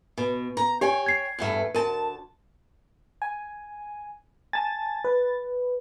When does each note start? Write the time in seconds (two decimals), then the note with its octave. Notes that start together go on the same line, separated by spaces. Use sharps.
0.17 B2
0.57 A#5
0.81 G4 C#5 G5 G#5
1.06 G#6 C7
1.39 E2 G2 A3
1.75 D2 A#4 A5
3.22 G#5
4.53 G#5 A5 A6
5.05 B4